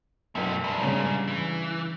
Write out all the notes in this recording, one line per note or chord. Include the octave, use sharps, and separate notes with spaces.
B1 F#2 A3 C#4
G#2 G3 A5 B5
G2 C#3 C#5
E3